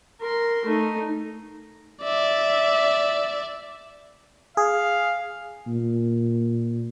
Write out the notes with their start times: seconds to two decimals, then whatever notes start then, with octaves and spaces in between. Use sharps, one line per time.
0.21 A#4 C6
0.65 A3 D#4
2.03 D5 E5
4.57 G#4 F5
5.67 A#2